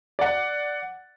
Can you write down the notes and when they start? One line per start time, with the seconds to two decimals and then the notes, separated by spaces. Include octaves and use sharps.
0.19 D5 F#5